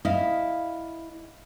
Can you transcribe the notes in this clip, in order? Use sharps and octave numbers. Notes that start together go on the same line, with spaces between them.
E4 D#5 F5